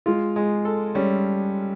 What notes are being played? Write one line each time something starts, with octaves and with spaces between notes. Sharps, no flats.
G#3 F4
G#3
A4
G3 C#4